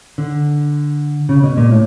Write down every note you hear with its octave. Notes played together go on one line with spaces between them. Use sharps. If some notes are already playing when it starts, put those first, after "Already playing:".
D3
C#3
B2
A#2
A2